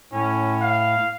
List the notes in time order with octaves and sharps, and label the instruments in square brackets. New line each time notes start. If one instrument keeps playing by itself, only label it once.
[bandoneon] A2 [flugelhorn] C#4
[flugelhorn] F5